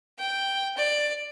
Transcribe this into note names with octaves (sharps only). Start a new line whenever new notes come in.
G5
D5